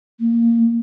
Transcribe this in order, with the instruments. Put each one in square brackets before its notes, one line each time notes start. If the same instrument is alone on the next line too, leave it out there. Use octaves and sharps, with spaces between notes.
[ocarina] A#3